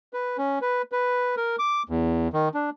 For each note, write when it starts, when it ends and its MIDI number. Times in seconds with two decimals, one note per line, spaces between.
0.13 0.37 71
0.38 0.59 61
0.61 0.82 71
0.92 1.35 71
1.37 1.56 70
1.59 1.83 86
1.89 2.28 40
2.33 2.48 51
2.54 2.70 62